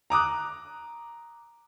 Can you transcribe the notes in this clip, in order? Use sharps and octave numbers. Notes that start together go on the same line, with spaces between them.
A#5 D6 D#6 F#6